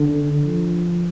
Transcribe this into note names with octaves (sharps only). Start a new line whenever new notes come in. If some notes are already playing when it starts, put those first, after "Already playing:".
Already playing: D3
F3